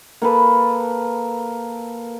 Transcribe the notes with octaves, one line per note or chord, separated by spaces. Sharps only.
A#3 A4 B4